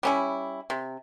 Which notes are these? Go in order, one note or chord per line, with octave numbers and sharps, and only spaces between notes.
G3 C#4 E4
C3